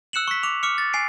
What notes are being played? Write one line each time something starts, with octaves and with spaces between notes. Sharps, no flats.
E6 F#6 C#7 E7 F#7
C#6 B6
D6 F7
D6 F6 C#7
A6
G#5 C7 D7